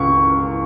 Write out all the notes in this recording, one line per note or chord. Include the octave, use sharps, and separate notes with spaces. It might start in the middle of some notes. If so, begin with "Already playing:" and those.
Already playing: C#2 C#6